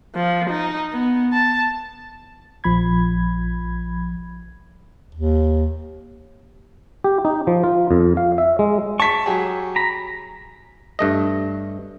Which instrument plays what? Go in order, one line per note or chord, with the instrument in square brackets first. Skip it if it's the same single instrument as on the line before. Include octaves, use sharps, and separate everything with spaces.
[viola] F3
D#4
B3
A5
[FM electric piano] A#1 F3 B5 G#6
[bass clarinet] D#2
[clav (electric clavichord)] G4
D#4
F3
F4
F2
F5
E5
G#3
[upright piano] A5 B6 [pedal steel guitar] C#6
[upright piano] F#3 G4 G#4
[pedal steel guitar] A#5 B5
[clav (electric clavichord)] G2 A3 D#5